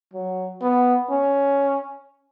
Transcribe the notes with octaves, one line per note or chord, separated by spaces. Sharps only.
F#3
B3
C#4